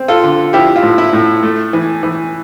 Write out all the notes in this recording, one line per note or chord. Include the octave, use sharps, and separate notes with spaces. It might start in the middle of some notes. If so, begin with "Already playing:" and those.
Already playing: C4
F4 A4
D3
F3 E4 G4
F4
A2
E4
A2
A3
E3
E3